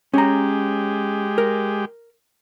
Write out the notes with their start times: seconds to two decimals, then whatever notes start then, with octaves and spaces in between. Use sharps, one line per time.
0.14 G#3 C#4 G4 A#5
1.38 A#4